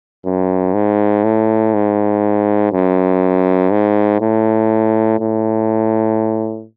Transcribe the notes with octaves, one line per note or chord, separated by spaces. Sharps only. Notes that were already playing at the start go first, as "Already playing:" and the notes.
F#2
G#2
A2
G#2
F#2
G#2
A2
A2